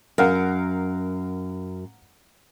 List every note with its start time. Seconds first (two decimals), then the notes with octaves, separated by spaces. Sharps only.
0.18 F#2 A#4 F5 F#5